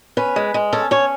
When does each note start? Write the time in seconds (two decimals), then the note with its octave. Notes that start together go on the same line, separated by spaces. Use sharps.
0.17 C#4 B4
0.36 G#3
0.54 G#3
0.73 C#4 A4
0.91 C#4 C#5